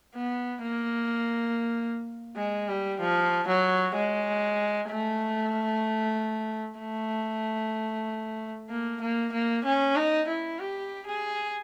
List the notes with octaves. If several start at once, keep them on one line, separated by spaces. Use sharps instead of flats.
B3
A#3
G#3
G3
F3
F#3
G#3
A3
A3
A#3
A#3
A#3
C#4
D#4
E4
G4
G#4